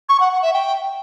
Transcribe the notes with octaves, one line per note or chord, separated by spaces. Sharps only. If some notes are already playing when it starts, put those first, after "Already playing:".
C#6
F#5
F#5
E5
G5